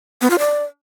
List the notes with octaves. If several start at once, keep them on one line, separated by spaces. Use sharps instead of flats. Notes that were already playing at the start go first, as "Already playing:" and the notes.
B3
F4
D5